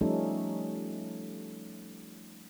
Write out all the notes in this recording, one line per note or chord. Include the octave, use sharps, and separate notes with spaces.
F3 G3 A3 C#4 D#4 A4